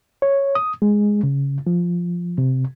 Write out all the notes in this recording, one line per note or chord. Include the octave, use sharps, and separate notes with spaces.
C#5
D#6
G#3
C#3
F3
C3